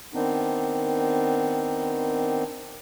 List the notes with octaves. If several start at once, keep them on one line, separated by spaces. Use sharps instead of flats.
D#3 B3 C4 D4 D#4